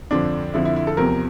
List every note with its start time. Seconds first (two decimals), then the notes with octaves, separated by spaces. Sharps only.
0.11 F2 D3 F3 D4
0.54 F2 D3 F3 E4
0.65 E4
0.76 E4
0.87 A4
0.97 E2 C3 F3 A#4